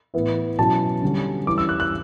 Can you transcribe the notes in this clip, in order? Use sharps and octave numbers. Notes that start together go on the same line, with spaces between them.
A2 E3 B3 E4
B2 F#3 C#4 E4 A5
D3 G3 C#4
E3 G3 C#4 D6
E6
F#6
F#6